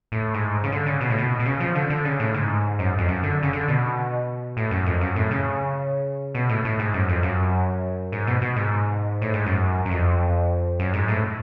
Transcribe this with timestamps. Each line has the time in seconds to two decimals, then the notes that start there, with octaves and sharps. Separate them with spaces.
0.12 A2
0.34 G#2
0.64 C#3
0.72 D3
0.86 C#3
1.01 B2
1.10 A2
1.18 B2
1.39 B2
1.46 C#3
1.60 F3
1.75 D3
1.90 D3
2.05 C#3
2.20 A2
2.34 G#2
2.79 F#2
2.99 F2
3.08 F#2
3.23 D3
3.43 C#3
3.53 D3
3.68 B2
4.57 A2
4.71 F#2
4.86 F2
5.01 F#2
5.16 A2
5.31 C#3
6.35 B2
6.49 A2
6.65 A2
6.79 G#2
6.94 F#2
7.09 F2
7.23 F#2
8.12 G#2
8.27 B2
8.42 B2
8.56 G#2
9.22 A2
9.34 G#2
9.46 F#2
9.85 F#2
9.90 F2
10.80 F#2
10.93 G#2
11.08 A2